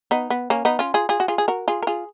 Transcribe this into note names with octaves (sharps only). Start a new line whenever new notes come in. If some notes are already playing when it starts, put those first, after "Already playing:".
B3 D#4
B3
A#3 C#4
B3 D#4
C#4 F4
F4 G#4
F4 G#4
F#4
F4 G#4
G#4
F#4 A#4
F4 G#4
A#4
F4 G#4